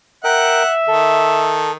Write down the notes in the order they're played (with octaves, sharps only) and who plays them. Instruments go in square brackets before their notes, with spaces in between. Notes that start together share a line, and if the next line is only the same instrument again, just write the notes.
[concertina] A#4 G5 [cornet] E5 [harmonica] F#5
[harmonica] D#3 [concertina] A4